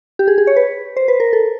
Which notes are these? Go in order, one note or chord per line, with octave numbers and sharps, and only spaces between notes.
G4
G#4
G#4
C#5
B4
C5
B4
A#4
A4